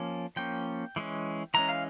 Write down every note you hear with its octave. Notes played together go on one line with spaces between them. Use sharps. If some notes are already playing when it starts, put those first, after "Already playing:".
Already playing: F3 A#3 C#4
F3 A#3 C#4 G5
E3 G#3 C#4
E3 G#3 C#4 A#5
F5